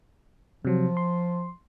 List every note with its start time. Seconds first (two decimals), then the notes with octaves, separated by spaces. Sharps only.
0.65 C3 F3 F#3
0.97 C6